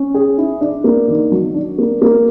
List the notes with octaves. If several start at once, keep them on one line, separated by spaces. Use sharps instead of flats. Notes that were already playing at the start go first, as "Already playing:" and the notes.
Already playing: C#4
G#4
E4
D4
A#3
D#3
F#3
D4
A#3
A#3